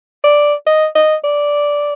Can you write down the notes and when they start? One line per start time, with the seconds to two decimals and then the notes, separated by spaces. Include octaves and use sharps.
0.24 D5
0.67 D#5
0.95 D#5
1.24 D5